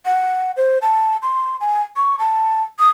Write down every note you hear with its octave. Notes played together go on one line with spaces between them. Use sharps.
F#5
C5
A5
C6
G#5
C#6
A5
D#6